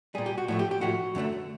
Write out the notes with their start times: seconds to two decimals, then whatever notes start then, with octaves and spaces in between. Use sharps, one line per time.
0.15 A#2 G3 G#4
0.26 G4
0.38 F#4
0.48 A2 F3 A3 F#4
0.59 G4
0.71 G4
0.81 A2 F3 A3 F#4
1.15 F#2 D3 F#3 A3